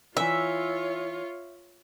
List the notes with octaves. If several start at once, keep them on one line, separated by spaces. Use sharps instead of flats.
D#3 E3 F4 C#5 E5